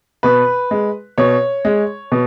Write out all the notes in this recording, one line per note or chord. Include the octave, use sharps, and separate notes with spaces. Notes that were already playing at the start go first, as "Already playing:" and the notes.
B2 B4
G#3
B2 C#5
G#3
B2